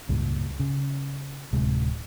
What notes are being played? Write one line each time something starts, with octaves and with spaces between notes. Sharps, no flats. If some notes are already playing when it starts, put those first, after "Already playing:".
C#2 G2 A#2
C#3
D1 C3 G#3